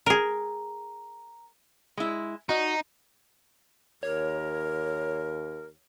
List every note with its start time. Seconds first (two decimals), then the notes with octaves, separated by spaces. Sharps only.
0.06 G#4 A#4 A#5
1.97 G#3 E4
2.49 D#4 F#4 D#5
4.03 D#2 A#4 C#5